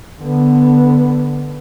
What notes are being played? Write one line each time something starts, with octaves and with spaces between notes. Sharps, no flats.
D3 B3